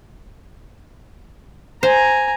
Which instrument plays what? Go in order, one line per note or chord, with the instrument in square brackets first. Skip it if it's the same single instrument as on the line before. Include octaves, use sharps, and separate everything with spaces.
[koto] C5 [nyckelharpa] G#5 A#5